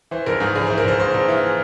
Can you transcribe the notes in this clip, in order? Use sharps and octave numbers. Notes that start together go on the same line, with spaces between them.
E3 C5
A#1 A#4
G#2 G#4
A#1 G#4
E3 C5
A#4
A#1 C5
G#2 C5
A#1
E3